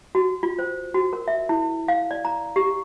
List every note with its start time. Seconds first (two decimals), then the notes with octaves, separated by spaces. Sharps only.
0.15 F#4
0.43 F4
0.59 C5
0.94 F#4
1.13 A#4
1.28 E5
1.49 E4
1.88 F5
2.11 D5
2.25 A#5
2.56 G4